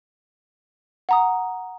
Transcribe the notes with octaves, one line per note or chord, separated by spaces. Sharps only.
F#5 A#5 D#6